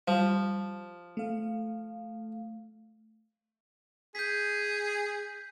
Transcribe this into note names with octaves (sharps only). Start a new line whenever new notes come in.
F3 G3
A3 F5
G#4 G6 B6